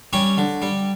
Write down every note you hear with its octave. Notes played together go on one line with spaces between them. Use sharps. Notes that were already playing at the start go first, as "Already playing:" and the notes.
G3 C#4 C#5
D3
G3